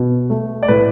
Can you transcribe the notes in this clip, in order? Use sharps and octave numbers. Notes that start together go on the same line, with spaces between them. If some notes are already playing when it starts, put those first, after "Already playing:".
Already playing: B2
A3
D5
A2 B4